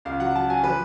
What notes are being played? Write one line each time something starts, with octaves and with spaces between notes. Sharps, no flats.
C#2 F5
F#3 F#5
F#3 A5
F#3 G#5
F3 B4